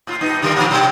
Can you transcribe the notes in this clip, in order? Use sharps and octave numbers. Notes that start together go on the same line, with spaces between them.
A2 F4
G2 B3 D#4
C#3 G3 A#4
A#2 F3
B2 G3 D#4